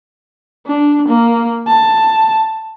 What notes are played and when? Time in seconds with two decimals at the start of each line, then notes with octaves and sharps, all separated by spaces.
0.67 D4
1.09 A#3
1.68 A5